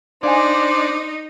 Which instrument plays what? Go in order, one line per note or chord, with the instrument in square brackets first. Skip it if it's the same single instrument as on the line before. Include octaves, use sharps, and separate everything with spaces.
[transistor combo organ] D4 [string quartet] D#4 [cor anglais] C5 [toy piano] D5 F5 G#5